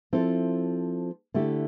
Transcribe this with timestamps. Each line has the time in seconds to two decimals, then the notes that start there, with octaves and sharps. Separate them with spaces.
0.13 F3 C4 E4 A4
1.34 D3 A3 E4 G4